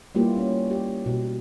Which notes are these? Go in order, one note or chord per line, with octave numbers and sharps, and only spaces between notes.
G3 A#3 B3 E4 F4 G4
C#4
G4
B2